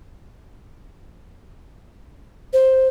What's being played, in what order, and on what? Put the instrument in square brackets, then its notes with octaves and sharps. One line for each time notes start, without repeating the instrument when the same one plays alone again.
[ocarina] C5